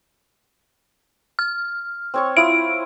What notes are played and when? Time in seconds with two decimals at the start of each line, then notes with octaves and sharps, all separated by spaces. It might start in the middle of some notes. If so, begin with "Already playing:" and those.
1.39 F6
2.14 C4 C#5 C#6
2.37 E4 F4 D#6 D7